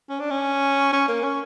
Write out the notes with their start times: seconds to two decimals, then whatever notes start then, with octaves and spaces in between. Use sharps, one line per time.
0.09 C#4
0.20 D4
0.30 C#4
0.93 C#4
1.08 A#3
1.23 C#4